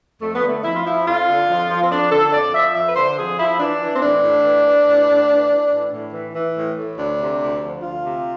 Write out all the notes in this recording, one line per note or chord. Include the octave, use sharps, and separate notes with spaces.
F2 A3
B3
D3
A3
F2 E4
F4
F3 E4
F2 F4
D3
F2
F3
C4
F2 D4
D3 A4
F2 D5
F3 E5
F2 E5
B4
D3 C5
F2 G#4
F3 E4
E3 D4
E3
C4
A2 D4
A2
E3
E3
A2
A2
E3
E3
A2
A2
E3
E3
A2
A2
D2 D4
C3
D2
F3
D2 F4
C3